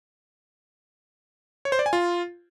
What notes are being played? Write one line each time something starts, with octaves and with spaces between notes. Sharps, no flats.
C#5
C5
D5
G#5
F4